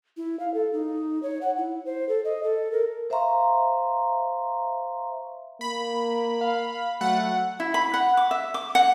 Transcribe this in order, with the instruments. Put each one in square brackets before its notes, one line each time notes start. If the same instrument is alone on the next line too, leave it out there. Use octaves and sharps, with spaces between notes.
[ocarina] E4
F5
A4
D#4
C#5
F#5
E4
C5
A4
D#5
A4
A#4
[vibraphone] C5 E5 F5 A#5 C6 C#6
[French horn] A#3 [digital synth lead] B5
[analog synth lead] F5
[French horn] F#3 [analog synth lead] A3 [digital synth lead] F#5
[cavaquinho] E4
B5
F#5
D6
E5
D6
F#5